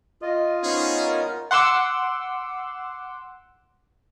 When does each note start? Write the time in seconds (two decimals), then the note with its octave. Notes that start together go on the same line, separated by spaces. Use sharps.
0.22 F4 D#5
0.63 B3 C#4 D#4 G#4 C5
1.00 A#4
1.51 F#5 C6 D6 E6